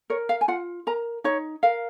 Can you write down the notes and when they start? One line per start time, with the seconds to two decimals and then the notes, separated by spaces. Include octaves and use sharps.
0.10 A#4 C#5
0.29 F5
0.41 G#5
0.48 F4 F#5
0.87 A#4 A#5
1.24 D#4 C#5
1.63 A#4 F5